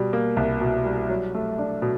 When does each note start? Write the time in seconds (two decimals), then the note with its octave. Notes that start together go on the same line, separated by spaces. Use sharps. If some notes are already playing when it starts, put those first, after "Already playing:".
Already playing: B2 G3
0.13 A#3
0.37 C2
0.61 B2
0.85 G3
1.09 F#3
1.35 A3
1.58 D4
1.82 B2